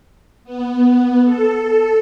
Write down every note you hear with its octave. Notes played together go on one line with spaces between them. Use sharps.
B3
A4